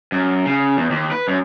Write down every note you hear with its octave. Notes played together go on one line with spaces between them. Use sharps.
F#2
C#3
E2
D#2
B4
F#2